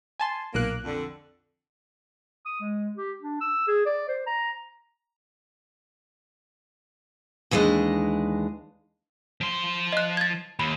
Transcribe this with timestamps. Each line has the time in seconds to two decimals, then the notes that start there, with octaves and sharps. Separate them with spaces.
0.20 G#5 A5 C6
0.54 B1 A#2 A#3 F#6
0.85 F2 D3
2.45 D#6
2.60 G#3
2.97 G4
3.21 D4
3.41 E6
3.67 G#4
3.86 D5
4.08 C5
4.26 A#5
7.51 D#2 E3 G#3 D4 D#5
9.41 F3 C6
9.92 D#5 F#6
10.17 G#6 A6
10.59 D#2 B5